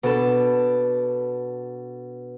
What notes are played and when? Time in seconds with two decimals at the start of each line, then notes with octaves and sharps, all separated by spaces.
0.03 B2 D4 A4 B5